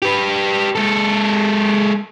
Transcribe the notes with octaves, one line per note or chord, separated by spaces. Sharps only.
G4 B4
G#3 A4